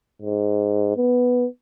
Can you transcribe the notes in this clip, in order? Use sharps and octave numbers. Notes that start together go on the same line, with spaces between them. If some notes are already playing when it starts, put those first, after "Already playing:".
G#2
B3